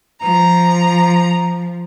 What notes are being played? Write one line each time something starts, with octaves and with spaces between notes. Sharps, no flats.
F3 A#5